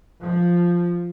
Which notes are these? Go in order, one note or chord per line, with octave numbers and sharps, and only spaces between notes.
F3